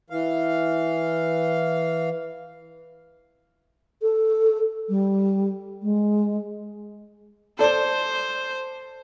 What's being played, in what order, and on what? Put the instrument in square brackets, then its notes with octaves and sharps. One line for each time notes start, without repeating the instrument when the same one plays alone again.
[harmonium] E3 F5
[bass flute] A4
G3
G#3
[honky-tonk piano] A4 D5 [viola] C5